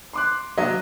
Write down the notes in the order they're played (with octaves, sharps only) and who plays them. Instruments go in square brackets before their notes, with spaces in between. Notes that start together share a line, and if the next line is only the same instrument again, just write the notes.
[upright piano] C6 D6 F#6
[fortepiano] F#3 A#3 D4 [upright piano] D#5